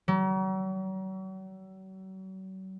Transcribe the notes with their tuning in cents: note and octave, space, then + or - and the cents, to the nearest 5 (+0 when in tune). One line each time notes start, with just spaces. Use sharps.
F#3 +40